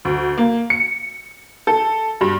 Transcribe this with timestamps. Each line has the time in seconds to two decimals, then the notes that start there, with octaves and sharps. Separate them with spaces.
0.05 D2
0.38 A#3
0.70 C#7
1.67 A4
2.21 G2